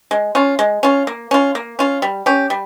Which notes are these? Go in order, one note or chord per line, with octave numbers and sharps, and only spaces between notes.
G#3
C#4 F4
G#3
C#4 F4
A#3
C#4 F4
A#3
C#4 F4
G3
C#4 G4
G3